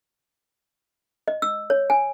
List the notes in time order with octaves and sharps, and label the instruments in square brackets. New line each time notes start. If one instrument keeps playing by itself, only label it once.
[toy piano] D#5
E6
C#5
G#5